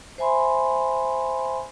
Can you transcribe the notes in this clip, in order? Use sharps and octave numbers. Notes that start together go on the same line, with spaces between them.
C5 E5 G#5 B5 C6